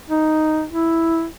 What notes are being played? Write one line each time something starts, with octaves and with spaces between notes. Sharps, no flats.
D#4
E4